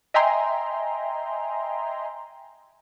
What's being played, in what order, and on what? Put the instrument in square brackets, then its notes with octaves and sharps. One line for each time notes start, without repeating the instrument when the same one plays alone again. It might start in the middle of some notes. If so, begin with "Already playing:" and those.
[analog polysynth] D#5 E5 G5 G#5 A#5 C6